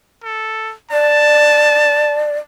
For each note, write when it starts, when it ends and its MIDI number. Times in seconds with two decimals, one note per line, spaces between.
0.24 0.73 69
0.92 2.37 74
0.92 2.29 81